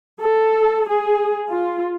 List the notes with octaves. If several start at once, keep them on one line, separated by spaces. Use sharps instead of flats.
A4
G#4
F4